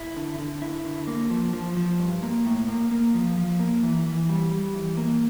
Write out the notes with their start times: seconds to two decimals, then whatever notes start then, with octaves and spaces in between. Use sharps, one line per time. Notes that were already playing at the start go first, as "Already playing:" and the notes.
Already playing: E4
0.17 D3
0.39 D3
0.62 E4
0.85 D3
1.07 A#3
1.30 F3
1.53 F3
1.77 F3
1.99 G2
2.23 A#3
2.46 A2
2.68 A#3
2.91 A#3
3.14 F3
3.37 F3
3.59 A#3
3.83 E3
4.06 E3
4.29 G3
4.51 G3
4.75 E3
4.97 A#3